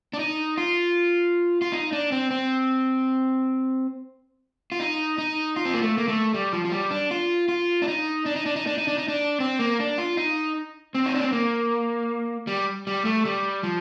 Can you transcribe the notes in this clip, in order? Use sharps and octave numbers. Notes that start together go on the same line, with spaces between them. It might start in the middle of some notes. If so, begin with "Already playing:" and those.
D4
D#4
F4
F4
D#4
D4
C4
C4
F4
D#4
D#4
F4
C4
A#3
A3
A#3
A3
G3
F3
F3
G3
D4
F4
F4
D4
D#4
D4
D#4
D4
D#4
D4
D#4
D4
D#4
D4
C4
A#3
D4
F4
D#4
C4
D#4
D4
C4
A#3
G3
G3
A3
G3
F3